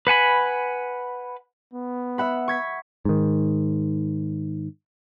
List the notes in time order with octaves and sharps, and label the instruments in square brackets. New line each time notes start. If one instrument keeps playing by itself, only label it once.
[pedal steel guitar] B4 F#5 G#5 B5
[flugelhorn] B3
[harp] E5 F#5 B5
C#6 G#6 B6
[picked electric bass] G#2 D#3